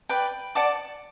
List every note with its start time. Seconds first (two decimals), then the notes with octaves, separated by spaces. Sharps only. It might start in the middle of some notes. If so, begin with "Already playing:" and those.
0.09 B4 D5 G5
0.55 D5 F#5 A5 D6